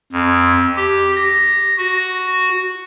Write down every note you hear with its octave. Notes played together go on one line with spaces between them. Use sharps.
F2
G4
A#6
F#4